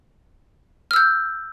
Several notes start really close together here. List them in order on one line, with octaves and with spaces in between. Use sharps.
F6 E6 G6